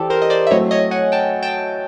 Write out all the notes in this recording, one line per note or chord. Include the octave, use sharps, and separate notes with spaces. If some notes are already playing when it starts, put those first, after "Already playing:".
Already playing: E3 G4 A4 C5 D5
A#4 C5
D#5
C5 D5
E5
F#3 A3 C4 E4 C#5 D#5
C#5 D#5
F#5 G#5
G5 A5
G5 A5